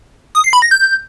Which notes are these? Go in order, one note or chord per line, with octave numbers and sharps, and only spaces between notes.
D#6
C7
B5
A#6
G6